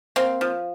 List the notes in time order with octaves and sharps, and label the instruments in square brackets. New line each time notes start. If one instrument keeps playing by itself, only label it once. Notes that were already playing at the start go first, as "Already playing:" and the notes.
[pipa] A#3 C4
F3